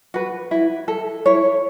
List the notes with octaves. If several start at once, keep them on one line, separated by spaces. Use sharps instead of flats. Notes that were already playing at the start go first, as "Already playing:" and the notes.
F#4 B4
E4
A4
E4 C#5